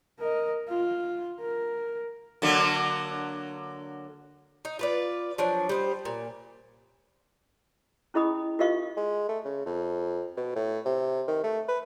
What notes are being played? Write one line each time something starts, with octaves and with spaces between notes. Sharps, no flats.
A#4 D#5
F4
A#4
D3 F#3 A#3
D#4
F4 B4 D5
F3 F#3 D4
G3 C5 D#5
A#2
C#4 E4 G#4 D#5 B5 D#6
F4 G4 A#4 D#5 F5 C#6
G#3
A3
C#3
F2
B2
A2
C3
D#3
A3
B4